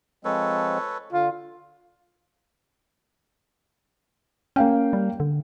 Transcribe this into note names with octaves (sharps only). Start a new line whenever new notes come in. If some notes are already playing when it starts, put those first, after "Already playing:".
F3 G#3 C4 A4 B4 C#5
D3 F4
A#3 C#4 F5 G5
G3
D3